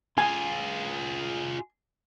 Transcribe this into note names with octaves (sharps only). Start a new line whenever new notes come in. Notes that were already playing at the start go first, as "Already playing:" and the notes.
F4 G#4 G#5